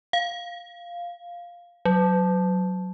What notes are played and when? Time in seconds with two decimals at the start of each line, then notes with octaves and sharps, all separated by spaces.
0.13 F5
1.85 F#3